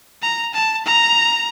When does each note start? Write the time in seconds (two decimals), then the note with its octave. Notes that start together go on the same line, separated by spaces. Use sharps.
0.22 A#5
0.54 A5
0.85 A#5